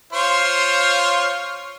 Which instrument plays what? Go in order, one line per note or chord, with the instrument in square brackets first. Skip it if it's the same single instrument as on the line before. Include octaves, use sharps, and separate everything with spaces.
[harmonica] F4 C5 C#5